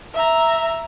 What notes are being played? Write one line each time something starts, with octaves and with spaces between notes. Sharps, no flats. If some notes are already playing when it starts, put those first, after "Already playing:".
E5 A#5